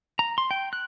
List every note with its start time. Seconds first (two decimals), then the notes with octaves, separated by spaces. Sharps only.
0.19 A#5
0.38 C6
0.51 G5
0.73 F#6